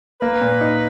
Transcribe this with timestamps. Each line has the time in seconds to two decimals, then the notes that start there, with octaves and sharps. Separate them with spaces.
0.22 A#3 B4
0.41 A#2
0.61 D#4